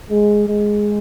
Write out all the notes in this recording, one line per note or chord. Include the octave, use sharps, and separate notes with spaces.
G#3
G#3